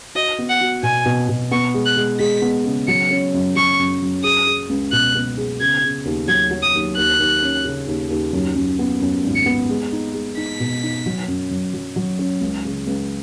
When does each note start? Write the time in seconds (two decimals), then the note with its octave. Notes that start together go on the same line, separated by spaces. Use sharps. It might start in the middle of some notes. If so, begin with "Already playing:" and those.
0.15 F#4 D#5
0.39 B3
0.49 F#5
0.61 F#4
0.83 B2 G#5
1.06 B2
1.29 B2
1.51 B3 C#6
1.74 G#3
1.85 F#6
1.96 G#3
2.20 G#3 B6
2.42 B3
2.65 C#3
2.88 F#3 C#7
3.10 C#4
3.34 F#2
3.55 F#3 C#6
3.79 F#2
4.02 F#2
4.23 G#4 D#6
4.47 G#4
4.69 C#2
4.92 B2 F#6
5.15 B3
5.37 G#4
5.60 C#3 G#6
5.84 C#3
6.05 D#2
6.28 F#3 G#6
6.51 F#3
6.62 D#6
6.74 D#2
6.97 D#2 F#6
7.19 D#2
7.42 C#4
7.65 C#3
7.87 D#2
8.10 D#2
8.33 F#2
8.55 F#2
8.79 B3
9.01 F#2
9.24 G#1
9.35 C#7
9.46 B3
9.69 G#3
9.92 D#4
10.14 G#3
10.37 D#4 B6
10.60 B2
10.83 D#4
11.06 F#3
11.28 F#2
11.51 F#2
11.73 F#3
11.96 F#3
12.19 C#4
12.41 C#2
12.65 C#3
12.87 C#2